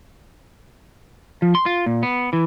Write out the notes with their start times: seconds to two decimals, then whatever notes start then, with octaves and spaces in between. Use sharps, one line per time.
1.42 F3
1.55 C6
1.66 F4
1.86 A#2
2.03 B3
2.33 E3